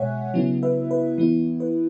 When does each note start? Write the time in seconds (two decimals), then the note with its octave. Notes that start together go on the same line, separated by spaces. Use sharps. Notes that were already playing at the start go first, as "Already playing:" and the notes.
Already playing: B2 G#3 C#5 E5 F#5 G#5
0.34 C#3 F#3 B3 E4
0.63 B4 E5
0.91 B4
1.18 E3 B3 E4
1.60 B4